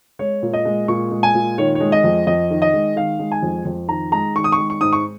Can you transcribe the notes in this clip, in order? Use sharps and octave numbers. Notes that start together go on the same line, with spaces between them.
G#3 C#5
A#2
D#5
G#3
A#2 C#6
G#3
G#5
A#2
D#3 C#5
C#5
G#3
D#5
F2
F2 D#5
D#3
D#5
G#3
D#3 F5
G#3
G#5
F2
F2
D#3 A#5
G#3 A#5
D#3 C#6
D#6
C#6
G#3
C#6
G#2 D#6
C#6